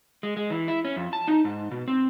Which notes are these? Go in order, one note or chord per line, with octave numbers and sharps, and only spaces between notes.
G#3
G#3
E3
E4
C#4
F2
A5
D#4
G#2
B2
C4